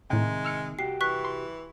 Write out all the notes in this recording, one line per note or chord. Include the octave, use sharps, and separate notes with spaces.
A2 C3 D#3 G#3 G5
E6 F6 C#7
C2 F#4 G4 C7
E3 C#6 F#6 B6
C6